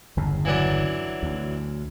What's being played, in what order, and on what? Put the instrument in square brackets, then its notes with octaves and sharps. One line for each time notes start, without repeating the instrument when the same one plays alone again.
[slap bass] G1 E2 C#3
[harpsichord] E3 F#3 D4
[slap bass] D2